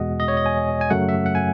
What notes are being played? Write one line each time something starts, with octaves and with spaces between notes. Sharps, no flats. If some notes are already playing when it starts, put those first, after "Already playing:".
Already playing: E2 B2 G#3 D#5 F#5
D#5
C#5
D#5
G#5
G#5
F#2 C#3 F#3 A3 F#5
E5
F#5
G#5